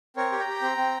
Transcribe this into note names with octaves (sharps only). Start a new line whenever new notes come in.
C4 A#4 C#5
G4
G5 A#5
G4
C4
C4